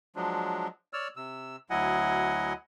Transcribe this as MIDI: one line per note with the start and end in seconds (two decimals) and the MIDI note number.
0.16 0.67 53
0.16 0.67 54
0.16 0.67 56
0.16 0.67 62
0.93 1.08 73
0.93 1.08 74
0.93 1.08 88
0.93 1.08 89
1.17 1.56 48
1.17 1.56 88
1.70 2.53 38
1.70 2.53 54
1.70 2.53 64
1.70 2.53 75
1.70 2.53 78
1.70 2.53 80